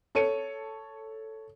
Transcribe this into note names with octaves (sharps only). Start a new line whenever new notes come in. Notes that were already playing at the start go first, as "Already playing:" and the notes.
A4 C#5 C#7 D#7